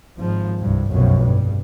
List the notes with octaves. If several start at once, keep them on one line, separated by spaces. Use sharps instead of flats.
G#1 F3
C2 G2
F1 B1 F#2
G2